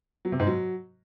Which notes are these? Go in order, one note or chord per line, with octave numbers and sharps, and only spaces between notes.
F#3
C3
G#2
F#3